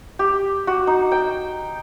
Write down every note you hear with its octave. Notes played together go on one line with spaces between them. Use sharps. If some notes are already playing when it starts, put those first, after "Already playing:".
G4
F#4
D#4
G5